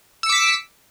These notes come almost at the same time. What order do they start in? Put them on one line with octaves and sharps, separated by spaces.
E6 C#7 D6 B6